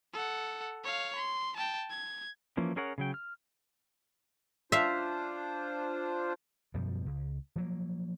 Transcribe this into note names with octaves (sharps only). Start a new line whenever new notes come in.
A4 F#5
C#5 F5
C6
G5 A5
G#6
E3 F3 A#3 C#4
C#4 G#4 A#4 C#5 F#5
C#3 F#3 G5
F6
D4 F4 C5 E5 F5
F#2 B2 F3 G3
C#2
F3 F#3 A#3